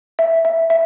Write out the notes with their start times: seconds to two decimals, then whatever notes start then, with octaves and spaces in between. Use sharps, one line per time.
0.19 E5
0.45 E5
0.70 E5